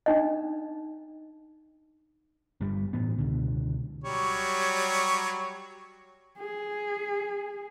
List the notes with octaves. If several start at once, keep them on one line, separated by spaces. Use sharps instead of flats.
D4 D#4 D#5
G1 G2 G3
A2 E3 B3
C#2 B2 D3
F#3 G3 C#5
G#4